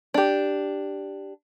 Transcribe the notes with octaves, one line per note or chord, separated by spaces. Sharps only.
D4 G4